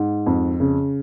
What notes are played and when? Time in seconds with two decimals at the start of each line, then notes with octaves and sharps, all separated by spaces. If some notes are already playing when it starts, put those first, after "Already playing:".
Already playing: G#2
0.26 F2
0.60 C#3